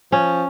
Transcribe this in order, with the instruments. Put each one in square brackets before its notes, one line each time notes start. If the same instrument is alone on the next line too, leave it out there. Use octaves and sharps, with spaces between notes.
[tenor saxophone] F3 [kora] C#4